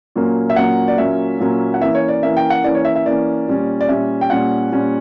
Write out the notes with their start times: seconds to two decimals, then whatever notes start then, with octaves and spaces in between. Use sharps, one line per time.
0.16 A#2 F#3 A#3 C#4
0.50 E5
0.56 A#2 F#3 A#3 C#4 F#5
0.88 D5
0.98 A#2 F#3 A#3 C#4 E5
1.40 A#2 F#3 A#3 C#4
1.74 F#5
1.81 E3 A#3 C#4 E5
1.95 C#5
2.09 D5
2.23 E3 A#3 C#4 E5
2.37 G5
2.50 F#5
2.64 E3 A#3 C#4 D5
2.75 C#5
2.85 E5
2.95 E5
3.06 E3 A#3 C#4 D5
3.47 A#2 G3 C#4
3.81 D5
3.88 A#2 G3 C#4 E5
4.21 G5
4.30 A#2 G3 C#4 F#5
4.72 A#2 G3 C#4